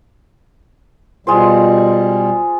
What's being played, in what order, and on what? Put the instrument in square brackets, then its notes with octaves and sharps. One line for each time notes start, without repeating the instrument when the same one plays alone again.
[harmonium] B2 G3 [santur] G#3 F4 C5